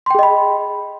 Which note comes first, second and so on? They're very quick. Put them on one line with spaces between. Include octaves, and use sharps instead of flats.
C6 G5 G#4 D#5 B5